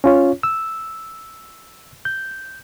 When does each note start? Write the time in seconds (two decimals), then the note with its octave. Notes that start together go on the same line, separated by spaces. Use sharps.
0.04 C#4 F4 C#5
0.43 E6
2.05 G6